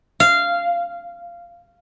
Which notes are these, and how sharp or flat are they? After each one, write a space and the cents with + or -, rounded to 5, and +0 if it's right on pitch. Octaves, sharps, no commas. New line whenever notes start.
F5 -15